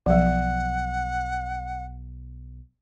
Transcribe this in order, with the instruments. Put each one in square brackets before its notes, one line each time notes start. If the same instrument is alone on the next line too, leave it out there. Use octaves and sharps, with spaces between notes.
[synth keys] B1 [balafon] F3 F#3 [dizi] F#5